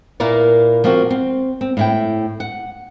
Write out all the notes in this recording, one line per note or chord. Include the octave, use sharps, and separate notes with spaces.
A#2 A#3 E4 A#4 B4 D5
F3 A#3 C4 F#4
C4
C4
A2 E4 G5
F#5